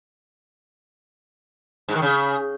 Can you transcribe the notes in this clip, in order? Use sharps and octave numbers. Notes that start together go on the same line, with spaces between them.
G#2
D#3
C#3